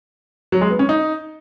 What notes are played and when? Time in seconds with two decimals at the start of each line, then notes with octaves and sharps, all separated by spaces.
0.52 F#3
0.61 G#3
0.70 B3
0.79 C#4
0.89 D#4